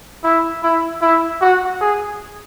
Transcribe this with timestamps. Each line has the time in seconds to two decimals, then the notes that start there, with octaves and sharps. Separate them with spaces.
0.24 E4
0.63 E4
1.02 E4
1.41 F#4
1.81 G#4